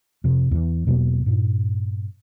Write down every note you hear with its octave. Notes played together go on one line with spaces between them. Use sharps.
F2 C3
E2 E3
E2 B2 F#3 A#3
G2 A#2